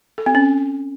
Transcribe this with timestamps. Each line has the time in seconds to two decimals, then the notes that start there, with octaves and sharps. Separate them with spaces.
0.18 A4
0.26 C4
0.35 C#4